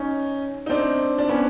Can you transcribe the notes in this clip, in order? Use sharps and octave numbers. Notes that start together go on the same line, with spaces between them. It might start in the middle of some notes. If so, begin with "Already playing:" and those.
Already playing: C#4 D#4
D#4
C4 D4
D4
B3 C#4